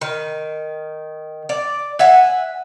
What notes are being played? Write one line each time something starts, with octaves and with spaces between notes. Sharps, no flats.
D#3
D5
E5 F#5 G#5